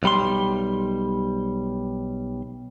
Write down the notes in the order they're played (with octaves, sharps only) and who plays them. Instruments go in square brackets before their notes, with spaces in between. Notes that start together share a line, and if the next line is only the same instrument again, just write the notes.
[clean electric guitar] B1 G3 C6